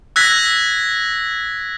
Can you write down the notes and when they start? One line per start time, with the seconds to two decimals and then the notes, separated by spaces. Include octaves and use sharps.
0.16 E6 F#6 G#6 A#6 B6